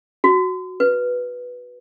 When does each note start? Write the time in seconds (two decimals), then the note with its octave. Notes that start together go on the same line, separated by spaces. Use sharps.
0.24 F#4
0.80 B4